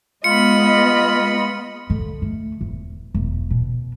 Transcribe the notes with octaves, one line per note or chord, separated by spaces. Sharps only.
G#3 B3 F4 D#5 B5 C#7
D3
A3
E1
E1
B2